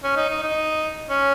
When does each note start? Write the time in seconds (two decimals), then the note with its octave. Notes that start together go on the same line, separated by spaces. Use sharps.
0.03 C#4
0.16 D#4
0.30 D#4
0.43 D#4
1.09 C#4